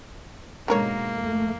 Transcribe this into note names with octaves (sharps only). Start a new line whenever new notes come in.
G#2 B2 D3 G#3 A#3 A#4 C#5
F2 A3